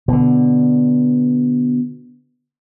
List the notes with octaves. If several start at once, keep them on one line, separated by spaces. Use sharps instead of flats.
B2 D3